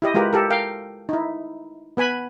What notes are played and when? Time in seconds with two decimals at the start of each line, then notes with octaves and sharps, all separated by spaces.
0.02 E4 G4 D#5
0.14 G#3 F4 G4 A#4 B4
0.33 G4 A4 A#4
0.50 A#4 F5 G5
1.09 D#4 E4
1.97 B3 B4 G#5 B5